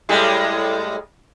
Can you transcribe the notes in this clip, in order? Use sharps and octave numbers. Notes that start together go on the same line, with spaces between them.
A2 G3 G#3